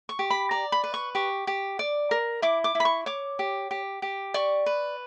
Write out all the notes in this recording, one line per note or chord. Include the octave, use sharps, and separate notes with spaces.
C#6
G4
B5
D5 A#5
B5
B4
C#6
G4 C#6
G4
D5
A#4
E4 D6
D6
E4
B5
C#6
C#5 D6
G4
G4
G4
D5 C#6
B4